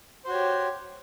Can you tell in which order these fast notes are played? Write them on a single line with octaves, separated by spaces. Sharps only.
C5 F#4 C#5 G4